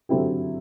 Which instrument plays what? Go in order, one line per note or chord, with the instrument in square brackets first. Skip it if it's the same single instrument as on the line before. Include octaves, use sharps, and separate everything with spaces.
[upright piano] D3 F#3 C4 E4 G4